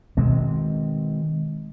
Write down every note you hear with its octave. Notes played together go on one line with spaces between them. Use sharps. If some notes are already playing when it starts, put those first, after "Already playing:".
B2 D#3 G#3 C4